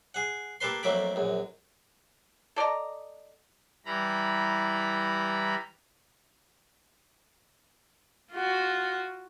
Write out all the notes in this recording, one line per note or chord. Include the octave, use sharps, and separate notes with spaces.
G#4 F#5
A#3 G4 A4 B4 C6
F2 F#3 A3 A#3 B5 D6
A#1 F#2
A4 D5 D#5 A#5
E3 G3 A#5 B5
F4 F#4